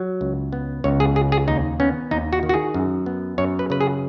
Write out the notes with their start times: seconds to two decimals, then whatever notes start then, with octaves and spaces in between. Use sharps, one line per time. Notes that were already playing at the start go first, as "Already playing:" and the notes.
Already playing: F#3
0.21 C#2
0.53 B3
0.84 C#2 C#5
1.00 G#4
1.16 C#3 G#4
1.32 G#4
1.48 D#2 D#4
1.80 B3 C#4
2.11 D#2 D#4
2.33 F#4
2.43 D#3
2.49 F#4
2.54 G#4
2.74 F#2
3.06 B3
3.38 F#2 C#5
3.59 B4
3.70 C#3 B4
3.81 G#4